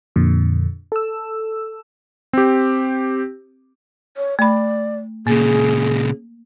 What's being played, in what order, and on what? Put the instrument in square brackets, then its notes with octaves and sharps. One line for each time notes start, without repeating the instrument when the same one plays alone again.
[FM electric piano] F2 A#2 D3
A4 E6
[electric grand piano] C4 G4
[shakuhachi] C#5
[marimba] A3 B5 [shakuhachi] D5
[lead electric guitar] A#2 C#3 [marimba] A#3 [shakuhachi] G#4